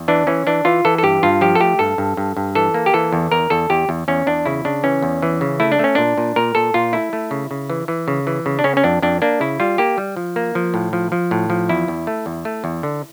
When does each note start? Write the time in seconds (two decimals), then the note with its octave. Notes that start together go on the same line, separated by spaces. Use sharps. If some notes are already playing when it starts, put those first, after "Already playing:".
Already playing: E2
0.08 E3 D4
0.27 E3 C#4
0.47 E3 D4
0.65 E3 F4
0.85 E3 A4
0.98 A4
1.03 G2 G4
1.23 G2 F4
1.41 F3 G4
1.55 A4
1.60 A3 G4
1.79 G2 A4
1.98 G2
2.17 G2
2.37 G2
2.55 E3 A4
2.74 A#3
2.86 G4
2.94 E3 A4
3.13 E2
3.31 E2 A#4
3.50 E2 A4
3.70 E2 G4
3.89 E2
4.08 E2 C#4
4.27 E2 D4
4.46 C#3 E4
4.65 C#3 D4
4.84 E3 C#4
5.02 E2
5.22 E3
5.41 C#3
5.60 A3 E4
5.72 D4
5.79 A3 C#4
5.95 A#2 D4
6.17 A#2
6.36 A#2 A#4
6.55 A#2 A4
6.74 A#2 F4
6.93 A3 E4
7.13 A3
7.31 C#3
7.51 C#3
7.70 E3
7.88 E3
8.08 C#3
8.27 E3
8.46 C#3
8.59 D4
8.64 C#3 C#4
8.77 C#4
8.84 F2 D4
9.02 F2 D4
9.22 A#3 D4
9.40 C#3 E4
9.60 G3 F4
9.78 A#3 G4
9.98 G3
10.17 F3
10.36 A#3
10.55 F3
10.74 A2
10.93 F3
11.12 F3
11.31 A2
11.50 F3
11.69 E2 E4
11.88 E2
12.07 A3
12.26 E2
12.45 A3
12.64 E2
12.83 D3